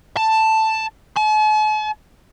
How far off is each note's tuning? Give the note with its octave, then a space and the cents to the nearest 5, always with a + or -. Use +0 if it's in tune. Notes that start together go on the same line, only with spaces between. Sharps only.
A5 +5
A5 -45